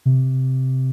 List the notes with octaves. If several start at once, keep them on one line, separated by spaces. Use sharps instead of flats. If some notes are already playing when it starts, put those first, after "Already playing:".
C3